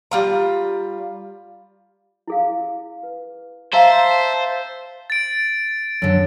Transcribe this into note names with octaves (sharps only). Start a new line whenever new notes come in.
G3 F4 A#5
E4 G#4 F5
B4
C5 E5 F5 A5 A#5
A6 D7
F#2 D3